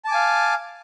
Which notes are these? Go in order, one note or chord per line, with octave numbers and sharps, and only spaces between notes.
F5 G#5 A5 D6